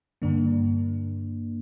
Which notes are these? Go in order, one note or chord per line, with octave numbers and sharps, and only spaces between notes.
G2 D3 A#3 D4